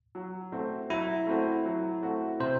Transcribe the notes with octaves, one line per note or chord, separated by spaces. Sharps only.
F#3
A3 C4 F#4
F#3 E4
A3 C4 F#4
F#3
A3 C4 F#4
C3 C5